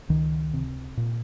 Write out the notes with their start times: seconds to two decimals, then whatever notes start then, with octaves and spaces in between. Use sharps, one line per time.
0.09 C#2 D#3
0.54 C3
0.97 A#2